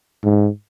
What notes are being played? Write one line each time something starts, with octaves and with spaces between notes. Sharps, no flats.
G#2